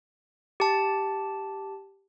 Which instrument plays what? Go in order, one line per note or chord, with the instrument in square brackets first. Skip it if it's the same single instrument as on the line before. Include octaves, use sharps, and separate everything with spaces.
[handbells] G4 A5